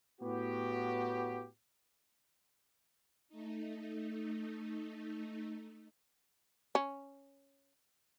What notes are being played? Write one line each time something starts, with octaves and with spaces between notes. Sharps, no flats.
A2 B3 F#4 G4
A3 D#4
C#4